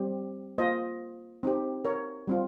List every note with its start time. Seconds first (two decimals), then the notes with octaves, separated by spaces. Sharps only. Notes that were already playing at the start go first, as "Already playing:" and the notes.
Already playing: G3 C4 G4
0.58 A#3 F4 C5 D#5
1.43 C4 D#4 G4
1.85 A#4 C#5
2.27 G3 C4 F4